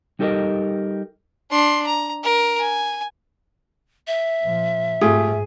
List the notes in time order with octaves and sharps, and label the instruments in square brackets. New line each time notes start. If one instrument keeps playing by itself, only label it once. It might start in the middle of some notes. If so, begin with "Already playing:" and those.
[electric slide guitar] G3 D#4 G4 A4 A#4 D#5
[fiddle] D4 C6
A#5
A#4
G#5
[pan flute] E5
[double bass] A#2 F3
[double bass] G#2 [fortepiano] A3 F4 G4 [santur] G#4